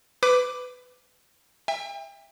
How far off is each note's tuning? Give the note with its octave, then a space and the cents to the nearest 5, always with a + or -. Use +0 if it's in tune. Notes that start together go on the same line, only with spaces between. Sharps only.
B4 +15 D6 +0
E5 +0 G5 +35